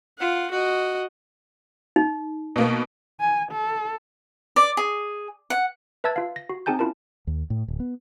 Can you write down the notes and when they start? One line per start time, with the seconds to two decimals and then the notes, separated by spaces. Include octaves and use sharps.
0.18 F4 F#5
0.51 F#4 D#5
1.96 D#4
2.56 B2 A#3 B3
3.20 G#5
3.52 A4
4.56 D5
4.77 G#4
5.50 F#5
6.04 B4 E5 A5 E6 G#6 A6
6.16 F4 F5
6.36 A#6
6.49 F#4
6.66 C4 D#4 G#4 G#5 A5 G6
6.79 C#4 E4 F4 A#4 A5
7.27 D#2
7.50 A2
7.68 D1
7.80 B3